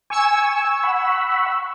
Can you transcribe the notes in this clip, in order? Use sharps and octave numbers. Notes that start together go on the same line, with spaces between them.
G#5 C#6 E6
F#5 B5